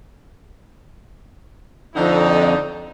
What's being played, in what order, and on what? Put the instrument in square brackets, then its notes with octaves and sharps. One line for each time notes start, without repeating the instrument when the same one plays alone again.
[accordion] F2 [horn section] D3 D#4